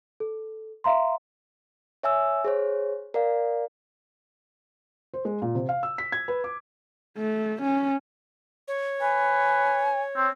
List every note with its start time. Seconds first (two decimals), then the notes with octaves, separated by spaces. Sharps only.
0.20 A4
0.84 E5 F5 A#5 C6
2.03 C#5 E5 G#5 E6
2.44 G#4 C5 C#5
3.14 A#4 D5 F5
5.14 C5
5.25 G#3
5.42 A#2
5.55 C3
5.69 F5
5.83 E6
5.98 B6
6.12 G#6
6.28 B4
6.44 D6
7.18 A3
7.62 C#4
8.68 C#5
9.01 B4 G#5
10.16 C4